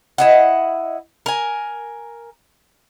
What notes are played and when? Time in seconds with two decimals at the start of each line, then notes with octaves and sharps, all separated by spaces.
0.18 E4 D#5 F#5
1.26 A#4 G#5